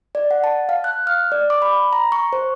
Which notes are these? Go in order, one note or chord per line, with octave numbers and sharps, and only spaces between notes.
D5
F#5
A5
F5
F#6
F6
D5
D6
B5
A#5
C#6
C5